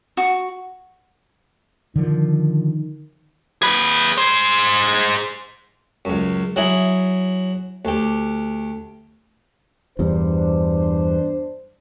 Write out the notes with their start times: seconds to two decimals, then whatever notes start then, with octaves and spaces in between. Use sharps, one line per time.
0.17 F#4
1.96 D3 D#3 F3
3.62 G#4 B4
4.18 G#4 C5
6.05 C#2 F#2
6.56 F#3 E4 G#4 E5
7.85 D2 G4
9.99 E2 G2 D4 C5